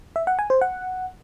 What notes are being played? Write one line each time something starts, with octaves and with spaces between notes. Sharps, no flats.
E5
F#5
G#5
C5
F#5